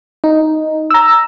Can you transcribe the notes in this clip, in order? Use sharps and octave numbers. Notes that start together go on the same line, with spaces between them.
D#4
A#5 E6